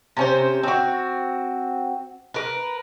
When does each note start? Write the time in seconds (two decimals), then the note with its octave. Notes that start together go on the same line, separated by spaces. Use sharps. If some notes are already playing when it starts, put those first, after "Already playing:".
0.17 C3 C#4 C5
0.63 C4 F#4
2.34 A#4 B4